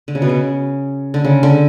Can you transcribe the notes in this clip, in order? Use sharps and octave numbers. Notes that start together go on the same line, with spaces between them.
D3
C#3
B2
C#3
D3
C#3
D3